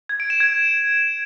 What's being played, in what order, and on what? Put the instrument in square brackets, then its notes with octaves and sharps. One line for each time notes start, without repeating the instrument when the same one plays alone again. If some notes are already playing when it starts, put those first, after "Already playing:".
[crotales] G#6
D7
E7
G#6